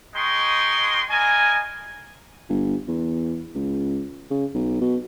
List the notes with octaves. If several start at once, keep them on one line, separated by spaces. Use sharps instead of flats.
G#3 D#4 D#5 G5 C6 C#6
E4 A#4 D#5 G#5
G1
E2
C#2
C#3
B1
B2